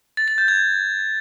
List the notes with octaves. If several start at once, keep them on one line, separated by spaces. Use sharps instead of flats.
A6
A6
G6
G#6